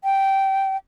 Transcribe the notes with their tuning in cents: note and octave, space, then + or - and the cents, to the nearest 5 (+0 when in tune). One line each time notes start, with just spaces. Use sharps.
G5 -15